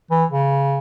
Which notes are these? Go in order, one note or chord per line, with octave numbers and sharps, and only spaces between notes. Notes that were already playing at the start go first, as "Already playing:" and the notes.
E3
C#3